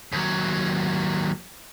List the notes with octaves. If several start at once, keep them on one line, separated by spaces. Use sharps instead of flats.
D#2 F#3